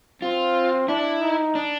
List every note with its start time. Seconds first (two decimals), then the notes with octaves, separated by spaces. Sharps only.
0.22 C4 F4
0.88 D4 E4
1.21 D#4
1.55 D4